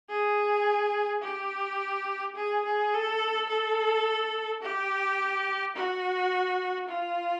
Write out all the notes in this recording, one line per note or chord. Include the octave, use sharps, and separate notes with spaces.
G#4
G4
G#4
G#4
A4
A4
G4
F#4
F4